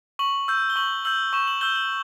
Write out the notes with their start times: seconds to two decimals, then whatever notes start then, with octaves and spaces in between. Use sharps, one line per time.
0.19 C#6 F#7
0.48 E6 G6
0.70 G7
0.76 C#6 F#7
1.05 E6 G6 F#7
1.33 C#6 E7
1.48 F#7
1.61 E6 G6 G7
1.76 F#7